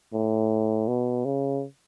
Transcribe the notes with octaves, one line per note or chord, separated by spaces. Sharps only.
A2
B2
C#3